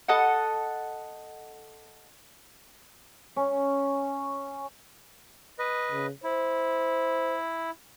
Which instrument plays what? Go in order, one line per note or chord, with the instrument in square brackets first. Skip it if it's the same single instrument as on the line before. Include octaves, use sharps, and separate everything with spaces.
[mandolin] A4 D#5 F#5
[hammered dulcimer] C#4
[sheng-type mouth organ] B4 D#5
[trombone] C#3
[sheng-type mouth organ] E4 [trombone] C5